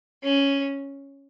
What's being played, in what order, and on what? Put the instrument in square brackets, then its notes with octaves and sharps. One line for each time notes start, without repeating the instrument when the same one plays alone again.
[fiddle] C#4